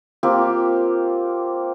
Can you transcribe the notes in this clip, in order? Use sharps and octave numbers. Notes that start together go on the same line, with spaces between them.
A#3 C4 F4 G4